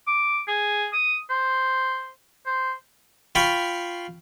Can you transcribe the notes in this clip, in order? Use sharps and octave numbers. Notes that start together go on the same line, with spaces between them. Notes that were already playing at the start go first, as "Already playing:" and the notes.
D6
G#4
D#6
C5
C5
F4 F5 G5 B5 C#6